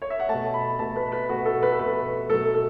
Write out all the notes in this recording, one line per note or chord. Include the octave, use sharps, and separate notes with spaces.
C#5
E5
F#5
B2 A3 A5
B5
B2 A3 A5
B4
B4
B2 A3 F#4
A4
B4
A4
B2 A3 B4
B2 F#3 A3 A4
A4